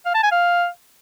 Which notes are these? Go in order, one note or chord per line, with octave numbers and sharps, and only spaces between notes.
F5
A5
G#5
F5